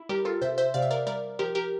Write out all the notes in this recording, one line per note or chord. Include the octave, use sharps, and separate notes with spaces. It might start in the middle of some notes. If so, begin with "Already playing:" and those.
Already playing: E4
G3 G4 A#4
F4 A4
C3 C5 E5
C5 E5
C3 D5 F5
E5
A#4 D5
G3 A#4 D5
F3 G4 A#4
G4 A#4